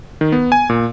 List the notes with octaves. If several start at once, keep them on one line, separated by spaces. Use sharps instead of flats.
D#3
B3
G#5
A#2